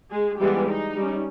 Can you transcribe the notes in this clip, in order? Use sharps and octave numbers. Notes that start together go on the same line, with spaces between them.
G#3 G#4
E3 G3 G#3 B3 G4
D#4
G3 C#4